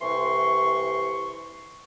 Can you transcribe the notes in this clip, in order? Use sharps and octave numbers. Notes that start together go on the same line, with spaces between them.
C2 C3 E3 C6 C#6